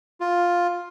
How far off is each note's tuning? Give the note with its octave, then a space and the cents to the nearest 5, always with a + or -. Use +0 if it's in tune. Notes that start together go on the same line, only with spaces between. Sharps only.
F4 +5